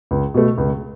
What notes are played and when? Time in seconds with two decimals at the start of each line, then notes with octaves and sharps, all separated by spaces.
0.11 C#2
0.34 B2 A3
0.58 C#2